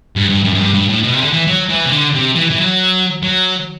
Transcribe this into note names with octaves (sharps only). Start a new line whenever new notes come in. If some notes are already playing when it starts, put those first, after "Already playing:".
G2
G2
F#2
F#2
G2
G2
A2
B2
C3
D3
E3
F#3
E3
C3
D3
C3
E3
E3
F#3
F#3